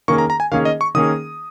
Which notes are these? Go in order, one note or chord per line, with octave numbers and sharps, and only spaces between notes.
D#3 A#3 C#4 G#4 C#6
A#5
A#5
G#5
D#3 A#3 C#4 G#4 F5
D#5
C#6
D#3 A#3 C#4 G#4 D#6